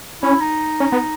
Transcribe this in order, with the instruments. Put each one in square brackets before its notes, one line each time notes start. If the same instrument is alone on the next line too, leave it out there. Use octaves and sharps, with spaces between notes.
[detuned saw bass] C#4 [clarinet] E4
[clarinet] D#4
[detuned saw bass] C#4
B3